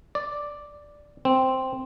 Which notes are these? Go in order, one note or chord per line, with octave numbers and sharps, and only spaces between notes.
D5
C4